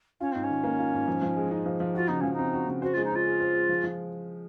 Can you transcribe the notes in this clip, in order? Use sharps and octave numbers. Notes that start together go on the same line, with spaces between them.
C#4 F4
G#2 C4
C#4
D#3
A#3
F4
G#2
F3
F3
G#3
D#4
F3
F3
F4 F#4
C#3 D#4
F3 C#4
D#4
C4
F#4
C#3
F#4 C5
G#3 F4
D#4
C#4 F4
G#4
C5
G#3
F3
F3